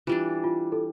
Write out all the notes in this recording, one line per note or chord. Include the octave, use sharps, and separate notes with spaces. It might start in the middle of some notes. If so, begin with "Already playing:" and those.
E3 G3 D4 F4
F4
A4